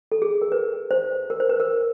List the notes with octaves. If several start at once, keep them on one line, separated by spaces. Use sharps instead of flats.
A4
G#4
A#4
B4
C5
A#4
C5
B4
A#4